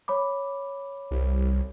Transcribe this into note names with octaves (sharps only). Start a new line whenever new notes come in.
C#5 B5 D6
C2